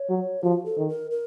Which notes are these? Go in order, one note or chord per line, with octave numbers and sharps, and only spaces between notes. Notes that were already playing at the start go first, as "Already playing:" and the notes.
Already playing: C#5
F#3
F3 F#4
A4
D#3
A#4
A#4